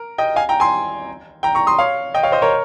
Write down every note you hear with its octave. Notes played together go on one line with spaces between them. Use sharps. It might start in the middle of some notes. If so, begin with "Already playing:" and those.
Already playing: A#4
D#5 G5
F5 G#5
G5 A#5
G#5 C6
G5 A#5
A#5 C#6
C6 D#6
C#5 F5
D#5 G5
C#5 F5
C5 D#5
A#4 C#5